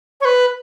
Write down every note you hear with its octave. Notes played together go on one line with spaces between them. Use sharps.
C#5
B4